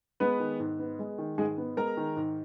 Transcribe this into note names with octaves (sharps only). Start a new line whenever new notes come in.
G#3 B3 B4
D#3
G#2
B3
G#3
D#3
G#2 G#3 G#4
B3
G#3 A#4 A#5
D#3
G#2